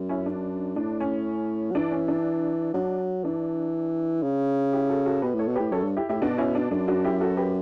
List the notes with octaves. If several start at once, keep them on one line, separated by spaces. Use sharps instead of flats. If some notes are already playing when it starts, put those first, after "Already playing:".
Already playing: F#2
C#4 E4
D4
A2 D4
C#4
F#3
E3 D4
C#4
D4
F#3 D4
E3 D4
C#3
E4 G4
F#4 A4
F#4 A4
B2 G4 B4
A2 A4 C#5
B2
A2 G4 B4
F#2 A4 C#5
G2
E4 G4
A2 E4 G4
B2 D4 F#4
C#4 E4
D4
F#2 D4
D4 F#4
E4 G4
F#4 A4
G4 B4